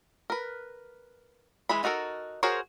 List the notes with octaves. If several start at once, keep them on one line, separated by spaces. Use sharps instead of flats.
A#4 B4
E3 G#3 B5
D#4 F#4 A4 A#4
F#4 G#4 A#4 C5 C#5